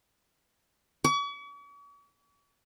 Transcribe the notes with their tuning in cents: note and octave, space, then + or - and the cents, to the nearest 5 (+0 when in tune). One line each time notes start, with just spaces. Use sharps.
C#6 +45